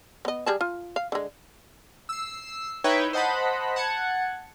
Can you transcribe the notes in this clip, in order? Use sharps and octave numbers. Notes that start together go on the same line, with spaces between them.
B3 D#5
G3 G#4 A5
F4
F5
D3 G#3
E6 C7
D#4 E4 B4 C#5 E5 G5
C5 D#5 F#5 A5 B5
F#5 A5 G#6 C#7